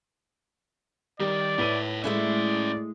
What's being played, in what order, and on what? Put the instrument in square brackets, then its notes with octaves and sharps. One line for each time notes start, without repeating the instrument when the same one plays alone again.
[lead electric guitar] D#3 [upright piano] G3 [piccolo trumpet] D5
[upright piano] A2 B4 D#7 [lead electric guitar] C#5 E5
[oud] G#3 A3 E4 [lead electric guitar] C#4 E5 [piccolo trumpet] D5